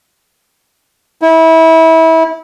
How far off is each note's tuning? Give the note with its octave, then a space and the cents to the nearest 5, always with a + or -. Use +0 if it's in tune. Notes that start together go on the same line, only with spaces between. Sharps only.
E4 -25